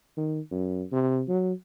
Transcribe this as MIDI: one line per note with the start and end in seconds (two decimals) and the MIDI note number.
0.17 0.40 51
0.51 0.83 42
0.92 1.23 48
1.28 1.53 54